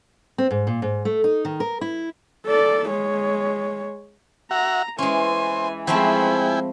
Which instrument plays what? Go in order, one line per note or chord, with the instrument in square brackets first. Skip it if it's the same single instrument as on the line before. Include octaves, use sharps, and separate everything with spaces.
[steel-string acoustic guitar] C4
G#2
A#2
G#2
A3
D#4
D#3
A#4
E4
[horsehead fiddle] A4 D5
G#3 C#5
[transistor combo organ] F#4 E5 F#5 [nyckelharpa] A#5
[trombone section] E3 [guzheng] G#3 C#4 [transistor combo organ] C5 [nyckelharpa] G#5
[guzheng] F3 A3 C4 [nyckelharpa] G#3 B5 [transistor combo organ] E4 G5 G#5